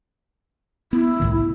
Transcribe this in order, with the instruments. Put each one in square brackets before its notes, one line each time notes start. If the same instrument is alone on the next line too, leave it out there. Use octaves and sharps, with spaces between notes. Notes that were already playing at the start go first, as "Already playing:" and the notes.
[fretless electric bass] B3 [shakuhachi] E4
[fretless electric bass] C2 A2 D#3